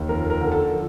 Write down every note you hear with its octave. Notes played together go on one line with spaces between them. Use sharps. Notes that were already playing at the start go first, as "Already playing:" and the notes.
Already playing: D#2
F2 A#4
A#4
D3
A4
F3